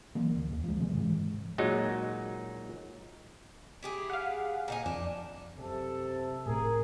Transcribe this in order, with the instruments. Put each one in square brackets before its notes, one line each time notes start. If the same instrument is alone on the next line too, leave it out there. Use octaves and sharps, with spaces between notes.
[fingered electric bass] E3 F#3 A#3
D2
D#2
F3 G#3
C3 D#3 F#3 G#3
G#2 E3 G#3
[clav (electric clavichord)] A#2 F#3 G#3 D#4
[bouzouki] E4 G4 G#4
[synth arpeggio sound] F5 F#5
[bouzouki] A#2 D#4 G#5
[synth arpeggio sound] F2 [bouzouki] D4
[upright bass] F#2 [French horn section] C3 [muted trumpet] A4
[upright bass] A2 C4 [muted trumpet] G#4 [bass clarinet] A#4